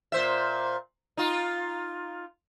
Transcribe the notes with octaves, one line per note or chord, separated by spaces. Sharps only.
A#2 C5 E5
D#4 F4